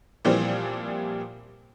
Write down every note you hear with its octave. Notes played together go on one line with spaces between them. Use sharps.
A#2 E3 F3 G3 A#3 C4